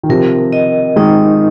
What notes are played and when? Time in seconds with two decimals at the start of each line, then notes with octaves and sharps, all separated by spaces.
0.03 D#3
0.09 C3 F3 A#4
0.52 D#5
0.96 D#3 G#3 D#4